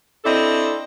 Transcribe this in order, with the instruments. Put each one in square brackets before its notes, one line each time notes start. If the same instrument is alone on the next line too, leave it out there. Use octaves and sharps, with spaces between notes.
[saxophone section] C4 D4 E4 A4 D#5